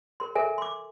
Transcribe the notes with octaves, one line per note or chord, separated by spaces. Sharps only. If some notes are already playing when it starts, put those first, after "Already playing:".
A#4 C6
A4 A#4 E5 G#5
C6 D6